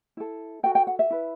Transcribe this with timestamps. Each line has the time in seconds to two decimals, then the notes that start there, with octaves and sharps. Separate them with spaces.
0.17 E4 A4
0.63 F#4 A4 G5
0.75 G5
0.87 F#5
0.99 E5
1.10 E4 B4